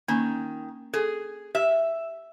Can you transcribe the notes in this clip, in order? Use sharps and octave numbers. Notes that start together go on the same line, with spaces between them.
D#3 A#3 C#4 G#5
G#4 A4
G4 E5